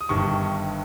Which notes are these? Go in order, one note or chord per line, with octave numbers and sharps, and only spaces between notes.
D#6
G1 G2 D#3 C#6